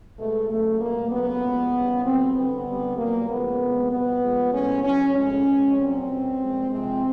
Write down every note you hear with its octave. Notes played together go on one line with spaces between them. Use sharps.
B2 G#3 A3
C#3 F#3 A3
B2 G3 A#3
C#3 F#3 B3
A#2 F3 G#3
C#3 E3 G3
A2 F#3 C4
D3 G3 B3
D3 G3
A#2 F#3 A#3
C#3 F3 G#3 B3
C3 F3 G#3
B2 G3 B3
A#2 F3 G#3
A2 E3 G#3 C#4
C#3 F#3 C#4
A2 F3 G#3 C#4
B2 G#3
A#2 F#3 C4
B2 G3
A#2 F3 G#3
C3 F3 G#3 C4